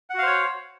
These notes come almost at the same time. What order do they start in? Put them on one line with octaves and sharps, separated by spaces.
F#5 F#4 F5 C5 C#5